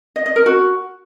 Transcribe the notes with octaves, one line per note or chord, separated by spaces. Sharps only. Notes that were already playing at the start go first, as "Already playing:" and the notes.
D#5
D#5
A#4
F#4